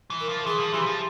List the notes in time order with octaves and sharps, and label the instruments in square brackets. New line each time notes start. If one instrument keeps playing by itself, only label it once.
[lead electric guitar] E3
[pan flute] A#4
[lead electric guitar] F3
[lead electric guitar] E3 [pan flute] G#4
[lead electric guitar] F3
[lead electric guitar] E3 [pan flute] G4
[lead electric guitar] F3